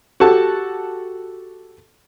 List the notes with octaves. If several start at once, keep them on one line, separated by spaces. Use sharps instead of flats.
F#4 G4 A4 A5